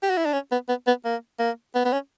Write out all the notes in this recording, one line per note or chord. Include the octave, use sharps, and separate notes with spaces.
G4
F#4
E4
D4
C#4
B3
B3
B3
A#3
A#3
B3
B3
C#4